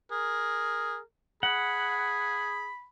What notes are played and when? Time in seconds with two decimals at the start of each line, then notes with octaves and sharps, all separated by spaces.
0.11 G#4 A#4
1.43 G#4 F#5 B5